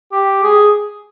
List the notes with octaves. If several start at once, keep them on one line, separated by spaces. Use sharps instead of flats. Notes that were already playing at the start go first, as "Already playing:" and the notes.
G4
G#4